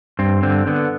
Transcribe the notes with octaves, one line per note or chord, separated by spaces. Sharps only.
G2 C4
D3 C4
D3 B3